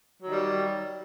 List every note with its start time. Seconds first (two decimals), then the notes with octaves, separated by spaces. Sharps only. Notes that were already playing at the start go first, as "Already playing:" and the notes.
0.22 F#3
0.27 D#3
0.32 G3